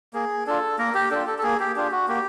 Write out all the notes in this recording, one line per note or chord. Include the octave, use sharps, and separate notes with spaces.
A#3 G#4
D4 F4 A4
A#3 A#4
G4
D4 F4 A4
A4
A4
A#3 G#4
G4
D4 F4 G4
F#4
A#3 G4